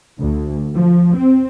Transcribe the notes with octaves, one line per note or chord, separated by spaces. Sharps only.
D2
F3
C4